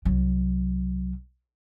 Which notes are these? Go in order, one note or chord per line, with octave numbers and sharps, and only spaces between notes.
C2 F#3